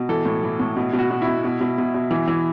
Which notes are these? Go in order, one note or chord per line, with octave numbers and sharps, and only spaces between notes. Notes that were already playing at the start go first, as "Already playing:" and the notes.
Already playing: B2
E3 A4
A2
E3
A2
B2
B2
F#4
B2
E4
B2
B2
B2
B2
B2
E3
E3